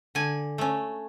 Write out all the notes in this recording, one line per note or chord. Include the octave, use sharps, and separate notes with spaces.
D3 G#5
A3 C#4